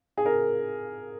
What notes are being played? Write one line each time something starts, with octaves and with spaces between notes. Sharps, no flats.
G#4
A#4